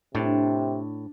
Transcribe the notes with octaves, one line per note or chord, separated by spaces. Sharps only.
A2 C3 D4